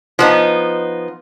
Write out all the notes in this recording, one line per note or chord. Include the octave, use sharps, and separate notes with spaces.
F3 B3 D#4